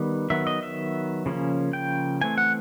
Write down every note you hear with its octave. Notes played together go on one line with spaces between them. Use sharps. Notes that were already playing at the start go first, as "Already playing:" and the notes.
Already playing: D#3 G3 B3
D#3 F#3 B3 E5
D#5
E5
C#3 F3 A#3 C#4
G5
E3 A3 C4 G#5
F#5